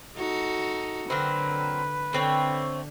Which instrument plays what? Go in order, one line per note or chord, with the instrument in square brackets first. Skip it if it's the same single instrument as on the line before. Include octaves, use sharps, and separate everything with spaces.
[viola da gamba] D#4 F#4 A4
[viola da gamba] D3 [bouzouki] F#3 A#3 C4 [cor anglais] B4
[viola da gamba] D3 [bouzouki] A3 C4 C#5